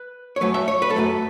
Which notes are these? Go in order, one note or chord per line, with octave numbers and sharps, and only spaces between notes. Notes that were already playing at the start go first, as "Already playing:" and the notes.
Already playing: B4
C#5
F#2 F#3 A3 B4
E5
C#5
B4
A4
F#2 F#3 A3 B4